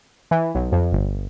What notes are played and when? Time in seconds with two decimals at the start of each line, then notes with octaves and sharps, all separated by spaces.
0.31 E3
0.55 B1
0.72 F2
0.92 G1